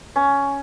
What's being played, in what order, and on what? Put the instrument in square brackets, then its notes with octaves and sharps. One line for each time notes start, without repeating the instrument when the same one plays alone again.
[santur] C#4